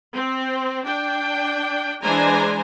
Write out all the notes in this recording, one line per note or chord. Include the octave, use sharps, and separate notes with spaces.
C4
D4 G5
E3 G#3 D4 C5 G#5 A#5